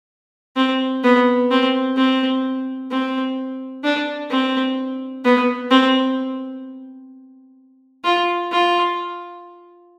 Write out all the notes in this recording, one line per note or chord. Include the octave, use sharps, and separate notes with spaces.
C4
B3
C4
C4
C4
D4
C4
B3
C4
F4
F4